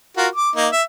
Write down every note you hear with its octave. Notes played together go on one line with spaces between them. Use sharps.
F4 F#4 A#4
D6
A#3 D#4
E5